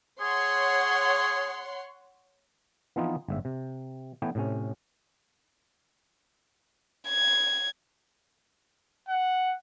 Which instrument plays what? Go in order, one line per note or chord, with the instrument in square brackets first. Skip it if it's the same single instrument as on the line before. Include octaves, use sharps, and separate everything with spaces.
[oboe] G#4 [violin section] C#5 F#5 C6
[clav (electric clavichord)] E3 F3 B3 C4 D#4 F4
G1 G#2 E5
C3
E3 A3 B3 C#5 G5
A2 C3 C#4
[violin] G#6
[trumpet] F#5